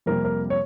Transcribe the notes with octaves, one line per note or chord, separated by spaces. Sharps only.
F2 C3 G3 A#3 A#4
A#4
C#5